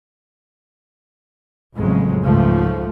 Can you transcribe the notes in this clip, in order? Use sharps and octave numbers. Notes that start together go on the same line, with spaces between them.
A1 F2 C#3 F#3 G#3
C#2 G#2 C#3 F3 A3